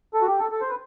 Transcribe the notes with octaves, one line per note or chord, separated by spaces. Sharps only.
A4
F#4
G4
A4
A4
C5
B4